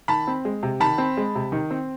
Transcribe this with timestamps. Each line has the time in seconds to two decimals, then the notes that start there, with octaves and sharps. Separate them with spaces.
0.08 D#3 A5 B5
0.27 C4
0.45 G#3
0.63 C3
0.80 D#3 A5 B5
0.98 C4
1.17 G#3
1.35 C3
1.52 D#3
1.71 C4